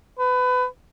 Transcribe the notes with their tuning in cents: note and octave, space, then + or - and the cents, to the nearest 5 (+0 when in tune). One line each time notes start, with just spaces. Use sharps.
B4 +25